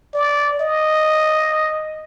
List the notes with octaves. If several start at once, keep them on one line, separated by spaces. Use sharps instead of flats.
D5
D#5